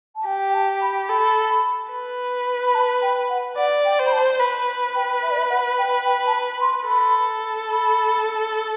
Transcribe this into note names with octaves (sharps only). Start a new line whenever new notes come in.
A5
G4 G5
G5
A5
B5
A4 B5
B4
B5
A5
G5
F#5
D5 F#5
G5
C5
B5
A5
B4 B5
G5
E5
D5
E5
F#5
G5
G5
A5
B5
C6
A4 B5
B5